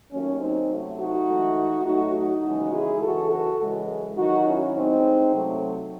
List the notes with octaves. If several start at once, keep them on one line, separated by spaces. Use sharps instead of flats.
D#2 D#3 F#3 A3 C#4
C4 D#4
C3 F#3 A3
D#4 F#4
G#2 E3 A3
A2 F#3 A3 D#4 F#4
D#4 F#4
D#2 C#3 E3 G#3
E4 G#4
F#2 C#3 E3 F#4 A4
F#4 A4
F#2 C#3 E3 G#3
G#2 D#3 F#3 D#4 F#4
C#4 E4
A2 G#3 C4 D#4
C3 F#3 A3